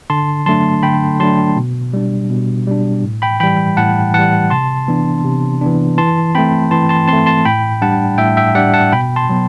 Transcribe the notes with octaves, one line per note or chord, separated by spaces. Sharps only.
D3 A5 C6
F#3 A3 D4 A5 C6
D3 G5 B5
F#3 A3 D4 A5 C6
B2
G3 D4
B2
G3 D4
A2
G5 B5
E3 G3 G5 B5
A2 F#5 A5
E3 G3 F#5 A5
C3 A5 C6
E3 B3 D4
C3
E3 B3 D4
E3 A5 C6
A3 C4 G5 B5
E3 A5 C6
A5 C6
C4 A5 C6
A3
A5 C6
A2 G5 B5
G3 D4 F#5 A5
A2 E5 G5
E5 G5
G3 D4 D5 F#5
F#5 A5
B2 G5 B5
A5 C6
F#3 B3